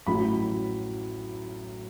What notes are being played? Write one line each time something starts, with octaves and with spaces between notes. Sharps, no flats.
A1 A2 F#3 B5